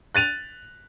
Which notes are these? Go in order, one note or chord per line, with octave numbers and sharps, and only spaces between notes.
F#6 A6 D#7 F7